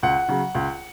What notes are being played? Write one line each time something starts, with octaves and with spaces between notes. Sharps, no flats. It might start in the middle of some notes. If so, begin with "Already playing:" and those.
C#2 F#5
C#3 F#3
C#2